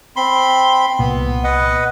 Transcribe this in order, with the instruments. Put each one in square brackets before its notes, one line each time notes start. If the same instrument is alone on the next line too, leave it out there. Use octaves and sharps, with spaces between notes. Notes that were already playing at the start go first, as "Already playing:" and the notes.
[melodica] C4 B5 C6
[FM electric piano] C2 A#2 [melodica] B3
[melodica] B4 D#5 F#5